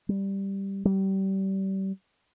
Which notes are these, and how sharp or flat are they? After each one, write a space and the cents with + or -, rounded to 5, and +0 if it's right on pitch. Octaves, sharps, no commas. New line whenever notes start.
G3 +0
G3 -30